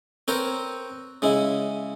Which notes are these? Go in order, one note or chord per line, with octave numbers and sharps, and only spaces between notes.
C4 A#4 B4 C#5 G5
C#3 G#3 E4